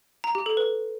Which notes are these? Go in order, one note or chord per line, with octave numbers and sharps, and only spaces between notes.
A#5
G4
A4
B4